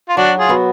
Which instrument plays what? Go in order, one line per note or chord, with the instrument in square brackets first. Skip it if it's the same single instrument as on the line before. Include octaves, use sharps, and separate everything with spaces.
[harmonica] F4
[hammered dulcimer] F#3 [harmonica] D4 F#4
[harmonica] F4 G#4
[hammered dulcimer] B3 F#4